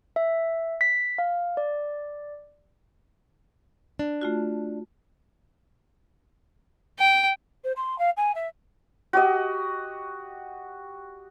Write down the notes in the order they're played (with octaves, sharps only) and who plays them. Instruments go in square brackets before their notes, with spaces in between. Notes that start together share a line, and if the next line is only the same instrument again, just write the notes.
[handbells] E5
B6
F5
D5
[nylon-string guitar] D4
[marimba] A3 F4 F#4
[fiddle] G5
[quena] C5
C6
F5
G#5
E5
[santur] F#4 G4 D#5